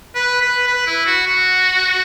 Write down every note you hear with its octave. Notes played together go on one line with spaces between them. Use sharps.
B4
B4
B4
E4
F#4
F#4